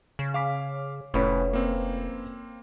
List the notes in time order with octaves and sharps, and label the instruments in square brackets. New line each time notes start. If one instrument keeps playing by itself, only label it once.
[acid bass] C#3
[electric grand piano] F5 D6 B6
[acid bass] F1 [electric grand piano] A2 B5 [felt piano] C#4 B4 C#5
[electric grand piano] A#3 C4